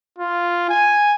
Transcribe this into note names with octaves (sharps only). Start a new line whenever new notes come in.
F4
G#5